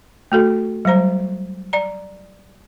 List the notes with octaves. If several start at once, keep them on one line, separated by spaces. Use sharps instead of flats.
A3 F#4 A4
F#3 G3 C5 A#5
D5 A#5